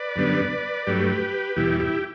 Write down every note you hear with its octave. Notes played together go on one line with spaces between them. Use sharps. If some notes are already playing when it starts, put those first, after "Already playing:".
Already playing: B4 D5
F#2 D3 G3 B3
G2 F#3 A3 G4 B4
E2 B2 G3 E4 G4
E4 G4